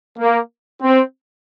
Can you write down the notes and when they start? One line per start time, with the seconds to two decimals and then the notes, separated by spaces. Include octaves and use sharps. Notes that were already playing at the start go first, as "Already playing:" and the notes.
0.19 A#3
0.81 C4